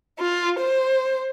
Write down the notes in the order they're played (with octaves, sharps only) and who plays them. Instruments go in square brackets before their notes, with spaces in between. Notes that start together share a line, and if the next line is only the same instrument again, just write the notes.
[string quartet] F4
C5